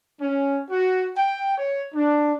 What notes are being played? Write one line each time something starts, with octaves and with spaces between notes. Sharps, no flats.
C#4
F#4
G5
C#5
D4